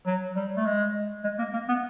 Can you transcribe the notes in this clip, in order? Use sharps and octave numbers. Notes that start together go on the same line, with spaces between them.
F#3
G3
A3
G#3
G#3
A#3
A#3
B3